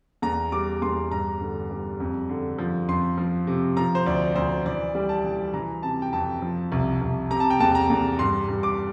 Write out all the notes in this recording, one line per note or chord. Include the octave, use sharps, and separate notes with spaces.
E2 A#5
G3 D6
E2 C6
G2 A#5
D3
G3
F2
D3
F3
F2 C6
F3
C3
F3 A#5
C5
D2 D5
D2 C5
E3 D5
G3
A5
E3
E3 A#5
C3 A5
G5
F2 A5
F3
C2
C2
C3 A#5
A5
G5
E2 A5
A#5
E2
G2 C6
G2
D6